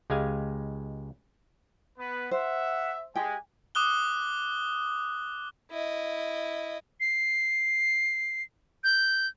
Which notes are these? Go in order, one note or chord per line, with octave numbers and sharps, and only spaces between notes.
C#2 G#3 G4 G#4 F5 G#5
B3 B4
C5 E5 F#5
G#3 G4 G5 G#5
D6 D#6 F#6 G7
E4 D#5
C7
G6